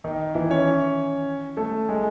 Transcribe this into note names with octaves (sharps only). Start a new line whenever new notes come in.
D#3 D#4
E3 E4
C#4 C#5
A3 A4
G#3 G#4